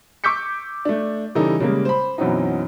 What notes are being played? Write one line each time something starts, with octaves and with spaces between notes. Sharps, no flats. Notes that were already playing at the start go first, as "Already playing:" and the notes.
C#6 D6 E6 G6 B6 C#7
A3 D4
C#3 E3 G3 D#4 A4
C#3 G3 G#3 A#3
C5 B5
F#2 B2 E3 F#3 C4 D#4